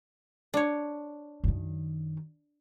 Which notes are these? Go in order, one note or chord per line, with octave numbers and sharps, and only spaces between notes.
D4 C#5
F#2 D#3